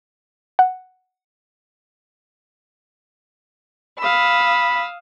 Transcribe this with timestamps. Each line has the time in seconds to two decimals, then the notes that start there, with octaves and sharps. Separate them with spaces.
0.59 F#5
3.99 F5 B5 D#6 E6